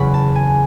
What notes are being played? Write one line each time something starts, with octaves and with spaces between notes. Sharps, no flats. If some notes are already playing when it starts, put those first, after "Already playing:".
Already playing: F#1 E2 C#3 B5 C#6
A5
G#5